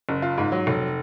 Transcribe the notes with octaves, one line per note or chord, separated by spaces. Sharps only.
F#1
F4
G#2
F#3
F1